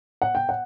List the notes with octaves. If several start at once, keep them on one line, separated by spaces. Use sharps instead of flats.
F#5
G5
F#5